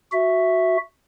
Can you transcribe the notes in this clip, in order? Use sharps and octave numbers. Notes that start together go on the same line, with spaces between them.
F#4 E5